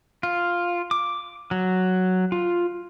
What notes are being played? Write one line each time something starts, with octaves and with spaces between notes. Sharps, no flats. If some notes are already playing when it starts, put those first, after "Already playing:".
F4
D6
F#3
F4